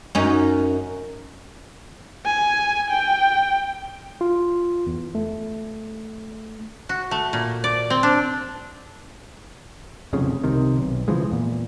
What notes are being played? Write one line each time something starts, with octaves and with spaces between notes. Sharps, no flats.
F#2 C#4 D#4
G#5
G5
F4
E2
A3
F#4
A3
A#2
D5
C4
D4
F1 B1 F2 C#3
C2 C3 D#3
B1
C#3 E3 F3 G#3
E2 A#2